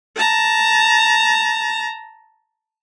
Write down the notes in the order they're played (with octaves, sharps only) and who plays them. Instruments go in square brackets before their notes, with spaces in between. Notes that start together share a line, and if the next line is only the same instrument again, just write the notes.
[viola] A5 A#5